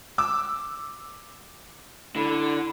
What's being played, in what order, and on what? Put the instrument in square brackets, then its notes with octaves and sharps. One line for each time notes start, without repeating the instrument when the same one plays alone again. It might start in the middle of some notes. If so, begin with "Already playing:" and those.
[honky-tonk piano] D6 E6
[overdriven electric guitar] D3 [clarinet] E4